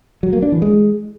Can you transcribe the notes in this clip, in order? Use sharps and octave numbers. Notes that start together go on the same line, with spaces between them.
F#3
A#3
D4
E3
G#3